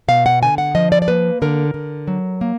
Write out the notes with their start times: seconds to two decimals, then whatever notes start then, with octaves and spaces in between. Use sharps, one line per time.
0.08 B2 F5
0.26 F#5
0.42 D3 G#5
0.58 F#5
0.75 F3 D#5
0.92 D5
1.02 D5
1.08 A#3 B4
1.42 D3 A#4
1.74 D3
2.08 F#3
2.41 A#3